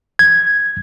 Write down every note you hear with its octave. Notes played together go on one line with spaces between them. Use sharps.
G#6